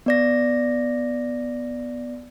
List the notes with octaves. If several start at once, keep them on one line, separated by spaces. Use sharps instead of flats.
B3 D5 A#6